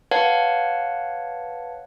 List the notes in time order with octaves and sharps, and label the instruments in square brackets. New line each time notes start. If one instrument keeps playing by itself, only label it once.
[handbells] B4 C#5 F5 F#5 A5